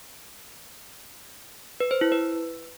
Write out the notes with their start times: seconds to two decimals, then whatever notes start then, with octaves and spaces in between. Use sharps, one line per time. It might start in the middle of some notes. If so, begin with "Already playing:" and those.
1.80 B4
1.91 C5
2.01 E4
2.12 B4